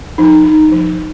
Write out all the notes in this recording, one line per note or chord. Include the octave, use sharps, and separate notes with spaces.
F3 D#4
D#4
F3